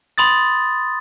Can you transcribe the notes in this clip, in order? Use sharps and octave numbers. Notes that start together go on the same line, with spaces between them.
B5 C6 D#6 A6